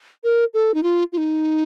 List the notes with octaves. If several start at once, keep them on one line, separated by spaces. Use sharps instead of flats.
A#4
A4
D#4
F4
F4
D#4